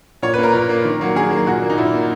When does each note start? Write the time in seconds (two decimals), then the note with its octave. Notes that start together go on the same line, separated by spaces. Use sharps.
0.22 A#2 C#5
0.34 B4
0.38 A#3 A#4
0.54 A#2
0.69 A#3
0.85 D#3
1.01 F#3 A#3
1.16 D#3 G#4
1.31 F#3 A#3
1.47 A#2 F#4
1.62 A#3
1.70 D#4
1.78 A#2 E4
1.93 A#3